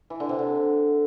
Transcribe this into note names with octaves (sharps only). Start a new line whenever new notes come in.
E3
D3
C3
D3